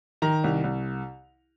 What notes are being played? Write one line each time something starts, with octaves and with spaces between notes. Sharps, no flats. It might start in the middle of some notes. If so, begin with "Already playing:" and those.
D#3 A#5
C2
C2